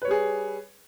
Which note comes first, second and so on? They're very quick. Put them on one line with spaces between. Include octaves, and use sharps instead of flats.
B4 C#5 G3 G#4